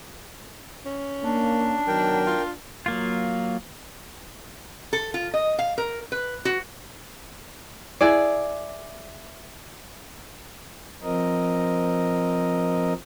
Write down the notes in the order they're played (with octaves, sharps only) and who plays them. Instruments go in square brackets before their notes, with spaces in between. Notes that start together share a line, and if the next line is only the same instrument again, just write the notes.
[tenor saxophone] C#4
[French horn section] A#3 [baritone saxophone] D4
[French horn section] B2 D#3 F#3 [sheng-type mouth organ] A#4 G5
[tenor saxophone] F4
[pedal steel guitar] F#3 A#3 F4
[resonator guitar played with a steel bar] A4
F4
D#5
F5
A#4
B4
F#4
[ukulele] E4 G#4 D5
[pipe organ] F3 C4 A#4 D#5